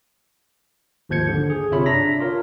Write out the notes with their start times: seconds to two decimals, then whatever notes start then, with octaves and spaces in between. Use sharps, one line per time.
1.09 G#1 D#2 F3 G6 G#6 C#7
1.28 D3
1.50 G#4
1.71 G1 C3 F4 C#5 E5 B5
1.86 D4 A#5 A#6 B6
2.20 F4 A#4 C#5 F5